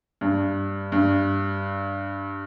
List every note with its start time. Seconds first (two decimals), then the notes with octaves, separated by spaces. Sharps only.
0.21 G2
0.92 G2